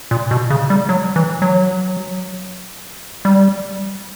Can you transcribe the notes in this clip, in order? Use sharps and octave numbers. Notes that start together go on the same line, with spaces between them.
A#2
B2
C#3
G3
F#3
E3
F#3
G3